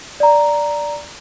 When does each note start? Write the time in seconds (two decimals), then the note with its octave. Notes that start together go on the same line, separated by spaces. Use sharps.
0.20 D5 A#5